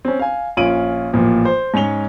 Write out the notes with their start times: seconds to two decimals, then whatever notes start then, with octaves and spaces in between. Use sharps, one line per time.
0.05 C4 C#4
0.19 F5 G#5
0.57 A#1 C#4 F4 D7 D#7 F#7
1.13 A1 A#2 F3
1.45 C5
1.74 G#2 C#4 C#5 G#5 F7 G7